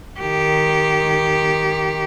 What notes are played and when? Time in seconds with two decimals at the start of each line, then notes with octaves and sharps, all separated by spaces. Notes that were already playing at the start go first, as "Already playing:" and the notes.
0.20 D#3 G4